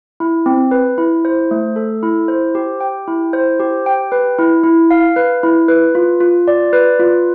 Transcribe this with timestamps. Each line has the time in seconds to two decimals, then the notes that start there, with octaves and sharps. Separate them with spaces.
0.20 E4
0.46 C4
0.71 B4
0.98 E4
1.25 C5
1.51 A3
1.76 A4
2.03 E4
2.28 C5
2.55 G4
2.81 G5
3.08 E4
3.33 C5
3.60 G4
3.86 G5
4.12 B4
4.39 E4
4.64 E4
4.91 F5
5.16 B4
5.43 E4
5.68 B4
5.95 F4
6.20 F4
6.48 D5
6.73 B4
7.00 F4